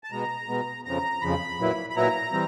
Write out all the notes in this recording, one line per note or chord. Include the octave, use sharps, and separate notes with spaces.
A5
B2 G#3 B3 A#5
B2 G#3 B3
F2 C#3 F3 A#5
F2 C#3 F3 B5
A#2 F#3 B3 E4
B5
A#2 F#3 B3 E4 A#5
E3 G3 C4